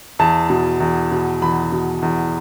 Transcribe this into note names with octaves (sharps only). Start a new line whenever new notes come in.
E2 A5
B2
E2
B2
E2 B5
B2
E2